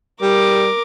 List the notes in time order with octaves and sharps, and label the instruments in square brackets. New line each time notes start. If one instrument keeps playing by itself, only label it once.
[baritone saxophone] G3 [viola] A#4 D6